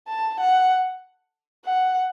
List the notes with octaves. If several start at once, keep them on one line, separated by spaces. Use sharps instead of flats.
A5
F#5
F#5